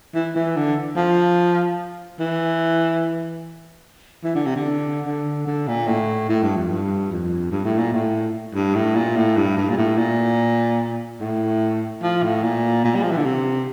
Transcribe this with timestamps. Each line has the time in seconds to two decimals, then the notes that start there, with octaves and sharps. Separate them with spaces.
0.15 E3
0.35 E3
0.56 D3
0.96 F3
2.20 E3
4.24 E3
4.35 D3
4.46 C3
4.56 D3
5.06 D3
5.47 D3
5.68 A#2
5.87 A2
6.29 A2
6.43 G2
6.56 F2
6.69 G2
7.11 F2
7.51 G2
7.65 A2
7.78 A#2
7.93 A2
8.54 G2
8.75 A2
8.95 A#2
9.16 A2
9.36 G2
9.57 G2
9.69 A#2
9.77 A2
9.98 A#2
11.20 A2
12.02 F3
12.23 A2
12.43 A#2
12.84 A#2
12.95 G3
13.03 F3
13.11 E3
13.17 D3
13.25 C3